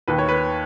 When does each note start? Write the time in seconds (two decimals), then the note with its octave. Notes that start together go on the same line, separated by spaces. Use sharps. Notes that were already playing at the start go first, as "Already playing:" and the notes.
0.08 D#2 B4
0.18 C#5
0.29 B4